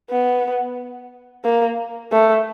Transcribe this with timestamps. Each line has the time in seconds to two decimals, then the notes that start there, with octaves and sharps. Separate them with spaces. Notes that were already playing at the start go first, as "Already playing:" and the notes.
0.10 B3
1.45 A#3
2.12 A3